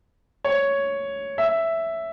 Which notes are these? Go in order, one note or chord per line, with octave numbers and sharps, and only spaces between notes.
C#5
E5